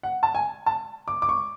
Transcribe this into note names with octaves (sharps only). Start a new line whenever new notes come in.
F#5
A5
G#5
A5
D6
D6
C#6